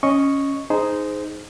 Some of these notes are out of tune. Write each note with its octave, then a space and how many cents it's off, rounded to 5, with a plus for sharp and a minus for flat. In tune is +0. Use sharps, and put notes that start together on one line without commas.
C#4 +0 D#5 +0 C#6 +0
D#4 +0 G#4 +10 C5 -15